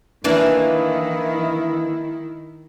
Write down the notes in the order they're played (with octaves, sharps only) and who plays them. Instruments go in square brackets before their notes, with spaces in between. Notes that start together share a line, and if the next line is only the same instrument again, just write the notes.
[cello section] D#3 E4 [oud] E3 A#3 D4